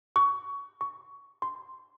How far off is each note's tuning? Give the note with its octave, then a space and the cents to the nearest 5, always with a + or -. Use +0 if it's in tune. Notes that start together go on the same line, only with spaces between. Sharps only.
C#6 +20
C#6 +10
C6 -5